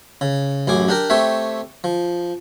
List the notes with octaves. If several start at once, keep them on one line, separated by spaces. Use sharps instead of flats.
C#3
A1 F#2 G#4 D6
D4 G4 A#4
A3 C4 G4 C#5 E5
F3